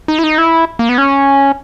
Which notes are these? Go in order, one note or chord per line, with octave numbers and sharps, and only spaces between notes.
D#4
E4
D#4
E4
A#3
B3
C#4